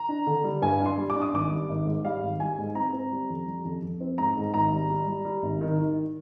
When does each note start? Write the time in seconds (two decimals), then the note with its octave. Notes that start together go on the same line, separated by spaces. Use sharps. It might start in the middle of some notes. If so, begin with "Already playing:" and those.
Already playing: A#5
0.09 D4
0.27 D3
0.44 G3
0.62 G2 G#5
0.80 D4
0.86 C6
0.98 G3
1.10 D6
1.16 D4
1.22 D#6
1.33 G#1 D6
1.51 G3
1.69 G#1
1.86 G#2
2.05 G3 F5
2.23 G#1
2.40 G3 G#5
2.58 G#2
2.75 C4 A#5
2.93 C4
3.12 G3
3.30 F2
3.47 G3
3.65 F2
3.83 F2
4.01 C4
4.18 G#2 A#5
4.37 G#2
4.54 G#1 A#5
4.72 G3
4.90 G3
5.08 G3
5.25 G3
5.43 G#1
5.61 D#3
5.79 D#3